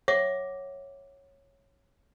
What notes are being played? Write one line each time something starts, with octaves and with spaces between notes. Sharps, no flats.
C#5 E5 F#5 D6